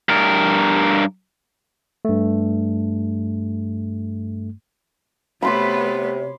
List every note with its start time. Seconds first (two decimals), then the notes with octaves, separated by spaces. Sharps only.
0.09 G2 A#4
2.05 G2 A3
5.42 C3 A3 B3 C#5 B5 C6 D6